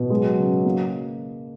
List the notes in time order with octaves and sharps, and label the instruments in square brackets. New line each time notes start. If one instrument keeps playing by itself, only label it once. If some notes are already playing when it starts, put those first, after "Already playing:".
Already playing: [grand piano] B2
[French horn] F#3 [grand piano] G#3
[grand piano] C#3
A#3